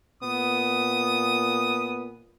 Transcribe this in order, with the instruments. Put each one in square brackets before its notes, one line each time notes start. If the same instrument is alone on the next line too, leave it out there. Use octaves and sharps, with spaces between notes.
[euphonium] A#2 [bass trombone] B3 [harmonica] D#6